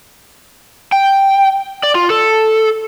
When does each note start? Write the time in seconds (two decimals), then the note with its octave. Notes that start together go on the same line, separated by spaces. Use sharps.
0.92 G5
1.83 D5
1.95 F4
2.10 A4